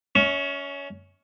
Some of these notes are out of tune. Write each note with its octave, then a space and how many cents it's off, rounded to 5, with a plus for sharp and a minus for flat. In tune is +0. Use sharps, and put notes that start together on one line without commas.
C#4 +20 E5 -30 C#6 +0